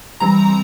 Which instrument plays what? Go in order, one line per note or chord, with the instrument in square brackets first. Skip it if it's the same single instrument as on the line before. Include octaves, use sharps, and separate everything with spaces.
[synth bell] E3 G3 C4 A#5